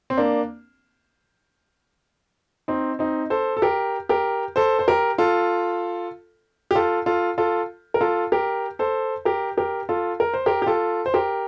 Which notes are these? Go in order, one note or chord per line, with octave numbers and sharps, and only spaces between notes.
C4
A#3 D4
C4 D#4
C4 D#4
A4 C5
A4
G4 A#4
G4 A#4
A4 C5
C5
G4 A#4
F4 A4
G4
F4 A4
F4 A4
F4 A4
A#4
F4 A4
G4 A#4
A4 C5
G4 A#4
G4 A#4
F4 A4
A#4
C5
G4 A#4
G4
F4 A4
C5
G4 A#4